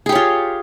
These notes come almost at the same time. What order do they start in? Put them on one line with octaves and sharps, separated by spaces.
G#4 G4 C#5 F4